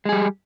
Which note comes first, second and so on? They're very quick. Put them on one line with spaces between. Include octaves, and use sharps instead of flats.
G#3 G#4 G3